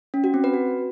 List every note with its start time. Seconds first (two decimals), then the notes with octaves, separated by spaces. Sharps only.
0.14 C#4
0.24 F#4
0.34 C4
0.44 B4
0.54 F#4